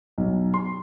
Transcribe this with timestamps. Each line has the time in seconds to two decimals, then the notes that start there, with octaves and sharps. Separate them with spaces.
0.18 B1
0.54 C6